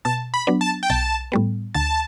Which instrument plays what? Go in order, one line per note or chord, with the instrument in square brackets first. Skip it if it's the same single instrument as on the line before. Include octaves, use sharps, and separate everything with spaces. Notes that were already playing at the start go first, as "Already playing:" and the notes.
[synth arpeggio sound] B2 [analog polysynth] A5
[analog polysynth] B5
[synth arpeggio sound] F#3 B3 D4
[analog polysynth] A5
G5
[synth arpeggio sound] B1 [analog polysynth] A5
[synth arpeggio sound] A2 G3 B3
[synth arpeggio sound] D2 [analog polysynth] A5